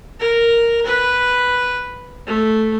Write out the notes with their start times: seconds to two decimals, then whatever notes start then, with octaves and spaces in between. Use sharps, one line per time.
0.20 A#4
0.86 B4
2.27 A3